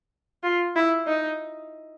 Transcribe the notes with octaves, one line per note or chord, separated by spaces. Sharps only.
F4
E4
D#4